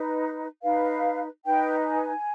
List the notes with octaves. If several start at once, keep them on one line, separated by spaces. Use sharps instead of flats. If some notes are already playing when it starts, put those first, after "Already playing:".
Already playing: D#4 B4
D#4 B4 F5
D#4 B4 G5
G#5